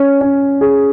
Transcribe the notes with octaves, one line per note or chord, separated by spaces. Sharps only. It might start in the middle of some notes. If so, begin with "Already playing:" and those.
Already playing: C#4
C#4
G#4